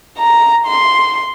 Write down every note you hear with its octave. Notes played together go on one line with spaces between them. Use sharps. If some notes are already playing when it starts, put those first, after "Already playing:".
A#5
C6